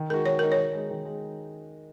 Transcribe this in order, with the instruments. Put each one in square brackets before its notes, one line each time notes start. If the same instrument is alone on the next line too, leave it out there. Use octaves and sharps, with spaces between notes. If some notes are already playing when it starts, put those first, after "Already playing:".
Already playing: [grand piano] D#3
[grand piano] G#3 D#4 F#4 [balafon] A#4
[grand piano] D#3 [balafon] C#5
[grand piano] G#3 D#4 F#4 [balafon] A#4
[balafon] C#5
[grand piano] D#3
G#3 D#4
D#3
G#3